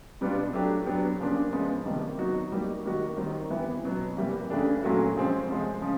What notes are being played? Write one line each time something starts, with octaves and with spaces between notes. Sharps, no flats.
B2 G3 B3 D4 F4
F#3 A3 D4 G4
F#3 B3 D4 G4
C#3 F3 A#3 D4
C#3 F3 G#3 B3
C3 D#3 G3 A#3
F#3 B3 D#4 F#4
G3 A#3 D#4
D#3 G3 A#3 D#4 F#4
D#3 G3 C4 D#4
E3 G3 B3 E4 G4
B2 F#3 B3
C3 E3 G3 A#3
C#3 E3 A3 D4 G4
A#2 F#3 A3 C#4 F#4
C#3 F3 G#3 C4
C3 F3 G#3
C#3 F3